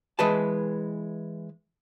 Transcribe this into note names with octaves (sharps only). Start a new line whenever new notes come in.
E3 G#3 B4 A5